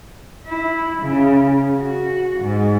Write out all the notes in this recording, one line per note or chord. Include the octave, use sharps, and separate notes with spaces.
E4
C#3
F#4
G#2